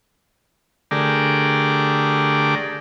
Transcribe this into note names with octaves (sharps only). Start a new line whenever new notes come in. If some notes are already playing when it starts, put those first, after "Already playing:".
D3 A3 G4 G#4 A#4 D5